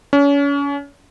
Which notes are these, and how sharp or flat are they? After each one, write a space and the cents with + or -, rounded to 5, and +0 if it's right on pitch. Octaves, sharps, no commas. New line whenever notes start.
C#4 +35